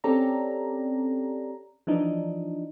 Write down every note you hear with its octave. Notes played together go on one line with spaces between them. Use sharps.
C4 C#4 G4 A4 D5 A#5
E3 F3 D4 D#4